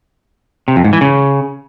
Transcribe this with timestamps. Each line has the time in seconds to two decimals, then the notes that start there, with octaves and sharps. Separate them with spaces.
0.68 C3
0.76 F2
0.84 G#2
0.93 E3
1.01 C#3